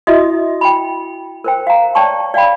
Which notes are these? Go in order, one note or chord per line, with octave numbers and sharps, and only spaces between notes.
E4 F#4 D#5 E5 D#6
G5 B5
A#4 C5 G5
F5 A#5
C#5 D5 G5 A5 C#6
D5 F5 G5 B5